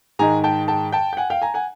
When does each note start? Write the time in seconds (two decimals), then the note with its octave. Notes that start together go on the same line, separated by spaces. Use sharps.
0.19 G#2 D#3 G#3 G#5 A#5
0.44 G5 A5
0.68 G5 A5
0.92 G5 A5
1.13 G5
1.17 F#5 G#5
1.30 F5 G5
1.42 G#5 A#5
1.54 F#5 G#5